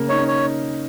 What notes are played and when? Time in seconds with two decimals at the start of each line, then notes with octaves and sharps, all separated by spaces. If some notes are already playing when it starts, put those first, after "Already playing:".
Already playing: C#3 A#3
0.09 D#4 C#5
0.18 C#4
0.28 C#5